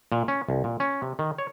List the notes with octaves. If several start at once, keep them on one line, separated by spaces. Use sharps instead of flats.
A#2
C#4
C2
A#2
C#4
C3
D#3
C#5